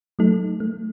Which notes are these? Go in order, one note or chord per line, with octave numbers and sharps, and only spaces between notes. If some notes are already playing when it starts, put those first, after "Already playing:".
F#3 A3 D#4 A4
A3